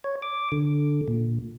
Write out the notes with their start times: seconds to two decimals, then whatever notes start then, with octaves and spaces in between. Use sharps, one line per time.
0.04 C#5
0.22 D6
0.52 D3
1.08 A#2